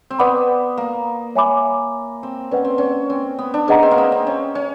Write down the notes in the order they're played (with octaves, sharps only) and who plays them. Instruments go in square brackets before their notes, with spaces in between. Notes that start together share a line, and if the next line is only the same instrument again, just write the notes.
[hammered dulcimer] C4
[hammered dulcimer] B3 [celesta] B4 D5 F#5 B5 D6
[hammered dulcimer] A#3
[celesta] C#5 E5 G#5 B5 D6
[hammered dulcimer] C4
[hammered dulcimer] C#4 [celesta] B4 D5 F#5
[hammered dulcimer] C4
C#4
C4
B3
D4
[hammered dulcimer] C#4 [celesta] G#4 B4 D#5 F#5 A#5
[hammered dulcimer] C4
A#3
B3
C4
C#4
C#4